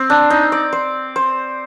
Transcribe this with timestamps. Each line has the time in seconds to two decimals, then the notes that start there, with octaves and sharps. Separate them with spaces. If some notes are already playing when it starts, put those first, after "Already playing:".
Already playing: C4
0.10 D4
0.30 D#4
0.52 D5
0.73 C5
1.16 C5